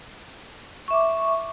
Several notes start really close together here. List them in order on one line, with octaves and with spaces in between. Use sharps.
C#6 E5 D6